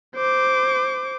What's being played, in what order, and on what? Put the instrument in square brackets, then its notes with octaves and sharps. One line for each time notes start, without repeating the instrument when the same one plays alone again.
[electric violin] C5 D6